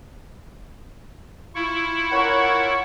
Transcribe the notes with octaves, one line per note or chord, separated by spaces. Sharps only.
E4 F4 C#6
A#4 C#5 F#5